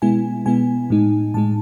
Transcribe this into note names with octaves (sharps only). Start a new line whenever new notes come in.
B2 G#3 B3 E4 G#5
B2 G#3 B3 E4 G#5
A2 G#3 D#4
A2 G#3 D#4 A5